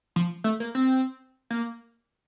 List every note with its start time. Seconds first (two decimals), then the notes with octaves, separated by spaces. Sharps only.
0.16 F3
0.44 A3
0.60 A#3
0.75 C4
1.50 A#3